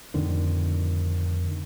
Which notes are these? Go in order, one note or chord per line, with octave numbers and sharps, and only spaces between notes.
F2 A2 D3 D#3